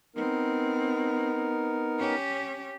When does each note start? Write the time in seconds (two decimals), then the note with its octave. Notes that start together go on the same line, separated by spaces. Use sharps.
0.16 B3 C4 D#4 A#4
1.99 C#4 G4